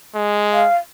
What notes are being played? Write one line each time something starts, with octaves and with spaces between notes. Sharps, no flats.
G#3
F5